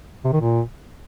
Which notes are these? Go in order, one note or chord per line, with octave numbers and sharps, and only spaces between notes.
C3
D#3
A#2